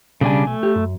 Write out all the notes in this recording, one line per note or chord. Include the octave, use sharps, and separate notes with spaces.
B1 C#3 G3 D4 G#5
A3
G4
F#2